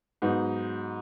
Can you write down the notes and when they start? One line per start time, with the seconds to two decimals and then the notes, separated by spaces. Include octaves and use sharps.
0.22 G#2 F#3 B3 D#4